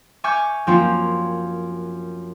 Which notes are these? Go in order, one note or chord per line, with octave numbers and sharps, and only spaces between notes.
E5 G#5 C#6 D6 F6 G6
F#2 F3 A#3 C4 C#4 F4